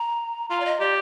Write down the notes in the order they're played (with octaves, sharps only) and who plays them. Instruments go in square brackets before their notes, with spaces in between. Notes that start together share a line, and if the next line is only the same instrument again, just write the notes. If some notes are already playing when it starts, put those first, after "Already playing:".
Already playing: [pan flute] A#5
[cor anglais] F4 [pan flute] A#5
[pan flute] D5
D#5
[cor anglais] G4 [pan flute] D5